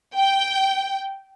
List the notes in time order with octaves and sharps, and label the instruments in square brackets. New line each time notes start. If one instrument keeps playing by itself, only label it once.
[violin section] G5